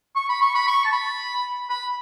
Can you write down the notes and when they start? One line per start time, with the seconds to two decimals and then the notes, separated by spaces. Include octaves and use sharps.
0.16 C#6
0.29 B5
0.41 C#6
0.55 B5
0.67 C#6
0.85 A5
0.92 B5
1.69 B5